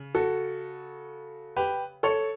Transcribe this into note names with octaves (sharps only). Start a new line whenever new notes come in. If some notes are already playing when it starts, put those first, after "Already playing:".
Already playing: C#3
F#4 A4
G4 B4
A4 C#5